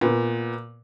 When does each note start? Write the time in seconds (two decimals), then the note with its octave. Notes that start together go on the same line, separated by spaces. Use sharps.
0.01 A#2 B3